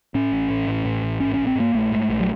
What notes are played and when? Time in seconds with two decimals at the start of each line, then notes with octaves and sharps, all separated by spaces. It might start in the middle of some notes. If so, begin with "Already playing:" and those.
0.14 A2 C#4
0.32 A1
0.50 A2
0.68 A1
0.85 A2
1.03 A1
1.20 G#2 C#4
1.34 A#1 C#4
1.47 C4
1.55 G#2 A#3
1.74 A#1 A3
1.91 G#2
2.09 A#1
2.20 F#3